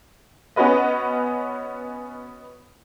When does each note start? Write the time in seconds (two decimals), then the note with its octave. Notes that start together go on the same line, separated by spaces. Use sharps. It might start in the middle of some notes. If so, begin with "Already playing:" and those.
0.56 B3 C#4 F#4 B4 D#5